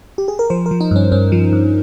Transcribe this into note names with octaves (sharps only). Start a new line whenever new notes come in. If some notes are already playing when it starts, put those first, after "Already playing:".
G4
G#4
A#4
F3 C5
A#4
F3
D#4
G2 C#4
G2 C#4
F3
G2